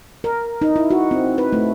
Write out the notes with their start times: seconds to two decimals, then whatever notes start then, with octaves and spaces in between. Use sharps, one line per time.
0.24 A#4
0.62 D#4
0.76 E4
0.91 F#4
1.11 C4
1.38 B4
1.53 A3